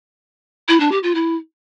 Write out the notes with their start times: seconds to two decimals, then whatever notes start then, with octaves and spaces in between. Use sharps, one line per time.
0.68 E4
0.80 D4
0.91 G4
1.03 F4
1.15 E4